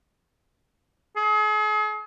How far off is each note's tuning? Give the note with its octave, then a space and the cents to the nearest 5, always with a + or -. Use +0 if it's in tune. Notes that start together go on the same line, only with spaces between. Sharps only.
G#4 +40